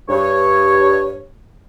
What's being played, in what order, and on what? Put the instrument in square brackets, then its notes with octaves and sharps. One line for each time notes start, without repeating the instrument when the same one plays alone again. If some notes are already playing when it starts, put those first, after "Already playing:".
[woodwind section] G2 C#5